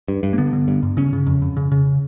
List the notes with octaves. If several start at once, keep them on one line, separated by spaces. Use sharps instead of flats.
G2
G2
A#3
D3 B3
D3
G2
G2
C#3 C#4
C#3
F2
F2
C#3
C#3